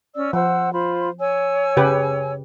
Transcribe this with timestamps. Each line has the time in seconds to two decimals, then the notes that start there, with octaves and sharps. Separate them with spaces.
0.15 C#4 D5 E6
0.33 F3 C5 F#5 E6
0.72 F4 C5 B5
1.20 C#5 G#5 E6
1.77 C#3 G4 B4